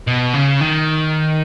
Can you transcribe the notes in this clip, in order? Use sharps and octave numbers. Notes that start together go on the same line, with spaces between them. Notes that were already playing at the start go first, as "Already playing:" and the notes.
B2
C#3
D#3